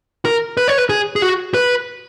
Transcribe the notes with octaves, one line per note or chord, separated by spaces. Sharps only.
A#4
B4
C#5
B4
G#4
G#4
F#4
B4